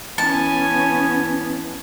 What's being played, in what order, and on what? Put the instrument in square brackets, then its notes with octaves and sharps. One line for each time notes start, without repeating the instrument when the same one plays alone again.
[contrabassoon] E3 [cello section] B3 C#4 [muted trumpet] G#5 [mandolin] A5